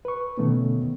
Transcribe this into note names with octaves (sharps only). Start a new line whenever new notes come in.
B4 C#6
B2 D3 D#3 A3 B3 C#4